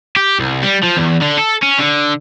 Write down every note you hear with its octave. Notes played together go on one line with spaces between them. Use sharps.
G4
C2
G3
F3
E2
D3
A4
C#4
D3